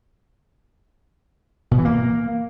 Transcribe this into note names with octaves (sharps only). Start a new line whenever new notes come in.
B2
E3
A#3